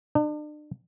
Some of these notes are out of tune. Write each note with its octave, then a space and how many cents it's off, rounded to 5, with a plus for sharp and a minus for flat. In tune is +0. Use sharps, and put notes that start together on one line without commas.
D4 +40